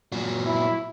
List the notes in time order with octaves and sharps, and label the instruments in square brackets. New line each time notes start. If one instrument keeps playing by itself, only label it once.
[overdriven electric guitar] A#2 F#3
[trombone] E4